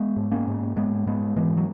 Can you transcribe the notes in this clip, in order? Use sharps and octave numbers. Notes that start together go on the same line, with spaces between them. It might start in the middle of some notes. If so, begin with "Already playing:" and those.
Already playing: G#3 B3
G#2
A#3 C#4
G#2
G#2 G#3 B3
G#2 G#3 B3
G#2 E3 G#3
F#3